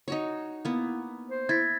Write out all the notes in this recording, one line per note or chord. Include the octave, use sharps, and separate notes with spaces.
D#4 F#4 C#5
A#3 B3 E4
C5
E4 G#6 A6 B6